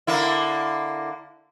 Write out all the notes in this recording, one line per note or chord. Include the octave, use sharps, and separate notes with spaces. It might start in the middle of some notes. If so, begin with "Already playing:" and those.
D3 A#3 E4